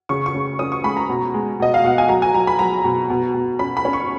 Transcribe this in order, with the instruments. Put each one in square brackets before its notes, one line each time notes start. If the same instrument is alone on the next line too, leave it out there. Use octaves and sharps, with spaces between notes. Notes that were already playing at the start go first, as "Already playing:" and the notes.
[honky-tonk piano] C#3 C#6
C#6
C#3
C#4 D#6
C#6
G#3 B5
A#5
B2
G#3
B2 D#5
F5
B2 F#5
G#5
F#3 A#5
G#5
F#3 A#5
B5
F#3 A#5
B2
B2
B2
C#4 B5
B5
C#4
C#6